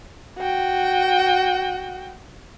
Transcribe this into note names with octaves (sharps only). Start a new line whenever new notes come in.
F#4 G5